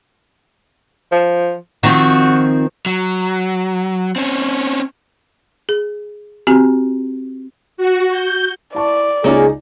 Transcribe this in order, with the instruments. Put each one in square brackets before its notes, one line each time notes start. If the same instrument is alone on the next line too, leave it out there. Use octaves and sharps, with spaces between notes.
[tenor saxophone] F3
[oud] D#3 F3 C4 [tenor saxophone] F#4
[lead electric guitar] F#3
C4 C#4
[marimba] G#4
C4 F#4 G4 G#5
[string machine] F#4
G6
[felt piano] E4 A5 C#6 [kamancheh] D5
[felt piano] C#2 D#4 [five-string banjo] A#3 C#4 F4 [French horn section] G#4